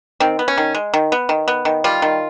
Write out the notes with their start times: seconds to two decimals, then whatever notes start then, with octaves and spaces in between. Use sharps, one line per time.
0.20 D#3 C4
0.39 B3
0.48 C#4
0.58 D#3
0.75 G#3
0.94 D#3
1.12 B3
1.29 D#3
1.48 B3
1.65 D#3
1.84 G3 F4
2.02 D#3